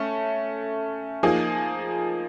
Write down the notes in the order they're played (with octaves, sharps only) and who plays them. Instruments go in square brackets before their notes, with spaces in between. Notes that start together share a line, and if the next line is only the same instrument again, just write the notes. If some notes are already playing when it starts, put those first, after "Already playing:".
Already playing: [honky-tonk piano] A3 C#4
F3 A#3 D#4 G#4